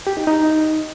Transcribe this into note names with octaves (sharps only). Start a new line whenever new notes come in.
G4
D#4
D#4